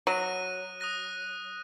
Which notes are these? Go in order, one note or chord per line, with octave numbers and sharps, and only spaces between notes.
F#3 D#6 F#6 A#6 D#7
D#6 F#6 A#6 D#7